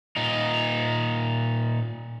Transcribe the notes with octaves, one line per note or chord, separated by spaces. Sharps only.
A#2 D#4